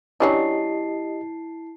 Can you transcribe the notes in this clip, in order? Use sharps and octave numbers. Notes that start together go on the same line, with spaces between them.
F#3 C#4 D4 E4 G4 D#5 A5 C7